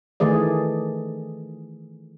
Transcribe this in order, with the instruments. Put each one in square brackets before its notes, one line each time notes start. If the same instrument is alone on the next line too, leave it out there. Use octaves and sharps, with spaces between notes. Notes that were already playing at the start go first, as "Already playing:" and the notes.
[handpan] D#3 E3 A3 G#4 D5